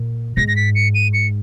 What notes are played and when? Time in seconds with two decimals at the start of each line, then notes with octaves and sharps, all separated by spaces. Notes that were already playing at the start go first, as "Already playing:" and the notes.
Already playing: A#2
0.37 G#2 A#6
0.48 A#6
0.56 B6
0.75 C#7
0.95 D#7
1.14 C#7